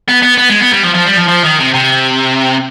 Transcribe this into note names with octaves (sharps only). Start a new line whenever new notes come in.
B3
B3
B3
G#3
B3
G3
F3
F3
G3
F3
F3
D#3
C3
C3